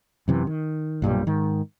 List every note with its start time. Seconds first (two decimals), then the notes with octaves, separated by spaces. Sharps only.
0.28 F#2 C3 E3
0.47 D#3
1.02 B1 G2 A#2 G3
1.27 G#2 D#3